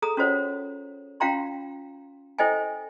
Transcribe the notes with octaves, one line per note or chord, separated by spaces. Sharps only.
G#4 A4 A#5 D#6
C#4 F4 F#4 C5 C#5 F#5
C#4 F4 F5 G5 A#5 C6
E4 A4 C5 D#5 G5 G#5